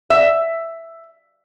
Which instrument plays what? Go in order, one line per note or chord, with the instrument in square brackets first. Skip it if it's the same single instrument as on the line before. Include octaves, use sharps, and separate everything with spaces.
[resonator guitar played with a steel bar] E5